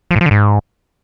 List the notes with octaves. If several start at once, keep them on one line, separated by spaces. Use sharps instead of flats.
F3
A2
F3
D3
G#2